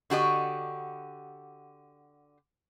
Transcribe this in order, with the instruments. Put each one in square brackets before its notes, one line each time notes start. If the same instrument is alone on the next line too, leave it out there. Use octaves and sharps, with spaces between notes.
[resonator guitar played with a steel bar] D3 F#4 G4 D#5